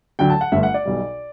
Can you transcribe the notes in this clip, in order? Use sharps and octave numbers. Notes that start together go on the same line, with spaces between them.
D2 D3 F#3 G5
A5
F#5
G1 G2 D3 A3 E5
F#5
D5
B1 B2 G3